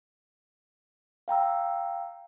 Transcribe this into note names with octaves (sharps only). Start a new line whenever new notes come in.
F5 G5 A#5 E6